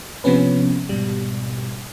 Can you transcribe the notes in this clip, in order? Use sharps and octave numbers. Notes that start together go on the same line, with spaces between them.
C3 F3 B3 C#4 B4
G#2 B2 G3